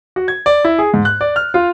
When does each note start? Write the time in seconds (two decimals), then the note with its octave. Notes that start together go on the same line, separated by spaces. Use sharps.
0.16 F#4
0.28 G#6
0.46 D5
0.65 E4
0.78 G#4
0.94 G#2
1.05 F#6
1.21 D5
1.36 F6
1.54 F4